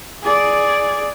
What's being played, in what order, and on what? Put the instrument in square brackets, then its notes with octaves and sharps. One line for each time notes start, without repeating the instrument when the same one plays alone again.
[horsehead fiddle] G#4 D5